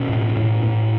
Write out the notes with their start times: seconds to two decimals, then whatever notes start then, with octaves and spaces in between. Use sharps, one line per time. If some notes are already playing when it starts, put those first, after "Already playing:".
Already playing: B2 C#4
0.09 A2
0.37 A2
0.64 A2